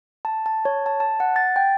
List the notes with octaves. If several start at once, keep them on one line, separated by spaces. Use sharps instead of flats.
A5
A5
C#5
A5
A5
F#5
A6
G5